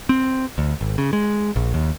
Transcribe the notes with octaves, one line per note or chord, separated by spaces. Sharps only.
C4
D2
G#1
C#3
G#3
A#1
D#2